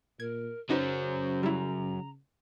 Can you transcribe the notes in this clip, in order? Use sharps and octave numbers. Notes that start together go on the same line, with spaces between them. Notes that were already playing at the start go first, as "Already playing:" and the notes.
A#2 A#4 G#6
C#3 F#3 C#4 D#4 F#4 B4 C5
G3 E4 A#5